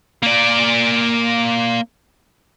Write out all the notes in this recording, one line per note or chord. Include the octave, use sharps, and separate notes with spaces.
A#3 D5